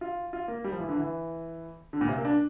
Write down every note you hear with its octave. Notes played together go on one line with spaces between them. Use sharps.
F4
F4
A#3
G3
F3
E3
D3
E3
D3
A#2
C3
A#3
D4